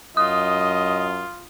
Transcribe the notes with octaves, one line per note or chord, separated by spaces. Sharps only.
F#2 F4 D#5 D#6